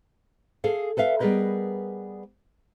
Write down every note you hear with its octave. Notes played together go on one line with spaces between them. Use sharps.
G#4 A4 F5
A4 B4 E5 F5
G3 B3 G#4 A#4 B4 D#5